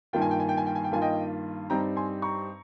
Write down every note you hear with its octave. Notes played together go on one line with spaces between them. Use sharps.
G2 D#3 A#3 F4 G5
G#5
G5
G#5
G5
G#5
G5
G#5
G5
G2 D#3 A#3 F4 G#5
D#5 G5
G2 G3 C4 D#4 G5 A#5
G#5 C6
A#5 C#6